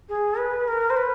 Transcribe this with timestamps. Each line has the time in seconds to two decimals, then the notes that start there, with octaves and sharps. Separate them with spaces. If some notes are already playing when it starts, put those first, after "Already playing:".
0.09 G#4
0.38 B4
0.68 A#4
0.90 C5
0.97 B4